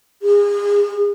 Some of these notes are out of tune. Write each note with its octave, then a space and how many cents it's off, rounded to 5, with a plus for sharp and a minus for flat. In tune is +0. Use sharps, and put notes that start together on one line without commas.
G#4 -35